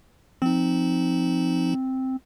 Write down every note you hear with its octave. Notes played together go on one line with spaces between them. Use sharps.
F3 C4 D#4